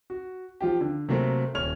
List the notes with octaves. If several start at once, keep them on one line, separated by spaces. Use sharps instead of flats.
F#4
F3 F4 G4
D3
C3 F#3 A3 A#3 C4
D#1 C#5 F6 F7